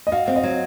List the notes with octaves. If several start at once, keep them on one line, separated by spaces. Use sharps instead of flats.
D#5
F#4 F5
C4
D#5
F#3